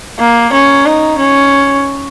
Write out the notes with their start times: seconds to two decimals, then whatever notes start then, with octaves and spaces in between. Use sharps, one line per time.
0.19 A#3
0.53 C#4
0.86 D#4
1.19 C#4